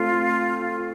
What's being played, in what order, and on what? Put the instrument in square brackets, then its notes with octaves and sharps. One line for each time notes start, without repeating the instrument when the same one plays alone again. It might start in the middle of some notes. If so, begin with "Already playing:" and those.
Already playing: [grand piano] A3 C4 [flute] F4